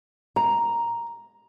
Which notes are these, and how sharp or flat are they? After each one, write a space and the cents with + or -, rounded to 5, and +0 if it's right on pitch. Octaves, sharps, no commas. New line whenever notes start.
A#5 +5